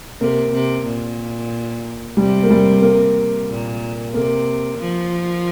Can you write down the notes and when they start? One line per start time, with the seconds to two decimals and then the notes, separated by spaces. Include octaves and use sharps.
0.21 C3 A#3
0.53 C3
0.86 A#2
2.17 C3 G3
2.43 A#3
2.51 G3
2.82 A#3
3.49 A#2
4.14 C3 A#3
4.79 F3